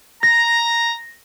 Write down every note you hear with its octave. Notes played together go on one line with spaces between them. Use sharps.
A#5 A#6